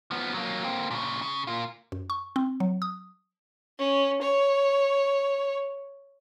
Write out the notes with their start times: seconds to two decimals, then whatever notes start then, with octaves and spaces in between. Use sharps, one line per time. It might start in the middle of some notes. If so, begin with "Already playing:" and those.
0.11 F3 B3
0.34 F#3 A#3
0.63 A#3 C4
0.91 A#2 C#3
1.22 C#3
1.47 A#3 F4
1.92 F#2
2.10 C#6
2.36 C4
2.60 F#3
2.82 D#6
3.79 C#4
4.22 C#5